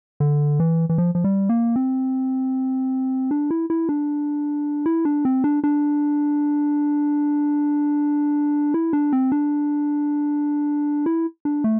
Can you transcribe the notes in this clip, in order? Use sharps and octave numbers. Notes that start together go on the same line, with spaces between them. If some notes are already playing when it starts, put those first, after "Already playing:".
D3
E3
E3
F3
F3
G3
A#3
C4
D4
E4
E4
D4
E4
D4
C4
D4
D4
E4
D4
C4
D4
E4
D4
A3